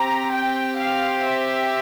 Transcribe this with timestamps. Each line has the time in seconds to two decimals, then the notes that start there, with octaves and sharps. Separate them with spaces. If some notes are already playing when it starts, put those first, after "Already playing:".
Already playing: C4 G4 A#5
0.33 G5
0.79 F5
1.26 E5